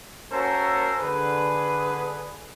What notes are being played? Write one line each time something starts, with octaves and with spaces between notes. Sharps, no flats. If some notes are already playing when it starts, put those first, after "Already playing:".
A#3 C#4 F#4 A4 A#4 C5
D3 G#4 B4